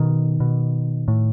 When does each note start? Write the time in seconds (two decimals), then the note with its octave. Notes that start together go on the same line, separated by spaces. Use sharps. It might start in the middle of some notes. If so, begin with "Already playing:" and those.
Already playing: B2 D#3
0.40 B2
1.08 A2